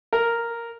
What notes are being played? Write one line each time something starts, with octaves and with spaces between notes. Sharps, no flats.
A#4